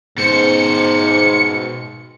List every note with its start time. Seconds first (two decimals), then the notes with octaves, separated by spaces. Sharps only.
0.18 G#2 B2 C5 C#7